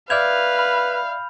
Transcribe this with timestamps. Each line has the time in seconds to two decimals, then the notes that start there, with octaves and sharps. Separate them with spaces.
0.10 B4 D5 E5 F5 F6 G6 G#6 F7
0.59 B5